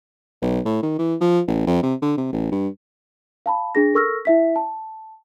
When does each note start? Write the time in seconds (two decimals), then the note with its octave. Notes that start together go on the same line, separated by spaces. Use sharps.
0.42 B1
0.65 A2
0.83 D#3
0.99 E3
1.21 F3
1.47 A1
1.67 F2
1.83 C3
2.02 D3
2.17 C3
2.33 A1
2.52 G2
3.46 F5 A5 B5
3.75 D4 G#4 A#6
3.94 A4 A#4 C#6 E6 F6 A#6
4.25 E4 E5 B6
4.56 A5